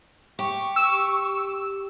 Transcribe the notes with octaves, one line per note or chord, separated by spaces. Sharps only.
G4 C#6
E6